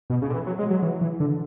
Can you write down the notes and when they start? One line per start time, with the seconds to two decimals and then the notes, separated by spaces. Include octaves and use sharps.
0.10 B2
0.22 C#3
0.30 D3
0.34 E3
0.46 F#3
0.59 G#3
0.70 F#3
0.82 E3
1.01 E3
1.20 D3